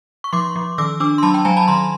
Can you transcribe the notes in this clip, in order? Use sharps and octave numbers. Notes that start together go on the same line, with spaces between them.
C#6
F3 C6 D6
F3
D#3 D6 E6
D4 D6 E6
C6
F#3 A5 B5
G5 A5
F#3 G#5 A#5
A5 B5
D#3 A#5 C6